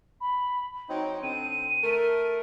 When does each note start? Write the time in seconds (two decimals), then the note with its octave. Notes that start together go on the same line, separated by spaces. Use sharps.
0.21 B5
0.90 F#3 C4 D#4 G5
1.23 D3 C4 D#7
1.84 A3 A#4